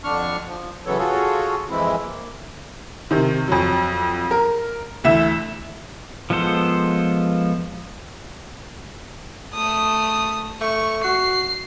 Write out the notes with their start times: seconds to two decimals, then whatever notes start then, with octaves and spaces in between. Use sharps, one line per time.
0.04 F2 D3 D4 C#6 F6
0.46 F3
0.86 C#3 E3 F#3 B3 A4 C#5
0.99 F4 F#4 G#4 A4 C#5
1.70 F2 E3 G#3 C4 E4
2.02 A#3
3.11 C3 D#3
3.48 F2 F#3
4.31 A#4
5.04 D2 E3 E5 E7
6.30 F3 G#3 B3 A4 C5
9.54 A3 D#6
10.61 A3 C#6
11.04 F#4 C7